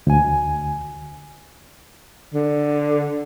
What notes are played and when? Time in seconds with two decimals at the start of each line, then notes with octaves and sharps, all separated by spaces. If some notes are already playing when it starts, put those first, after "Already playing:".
0.07 D2 G#5
2.34 D3